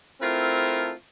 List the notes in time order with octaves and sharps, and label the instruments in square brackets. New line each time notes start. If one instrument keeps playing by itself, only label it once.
[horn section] A3 C4 E4 F4 A4 A#4